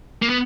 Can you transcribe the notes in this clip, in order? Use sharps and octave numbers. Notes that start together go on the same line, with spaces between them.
A#3
B3